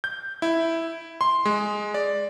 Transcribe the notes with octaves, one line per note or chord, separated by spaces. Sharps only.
G6
E4
C6
G#3
D5